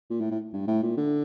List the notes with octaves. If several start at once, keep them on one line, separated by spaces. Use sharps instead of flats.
A#2
A2
A2
G2
A2
A#2
D3